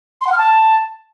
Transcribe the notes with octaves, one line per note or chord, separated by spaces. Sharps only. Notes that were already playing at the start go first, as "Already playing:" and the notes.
C6
F#5
F6
A5